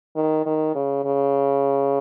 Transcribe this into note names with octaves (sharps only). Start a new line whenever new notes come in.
D#3
D#3
C#3
C#3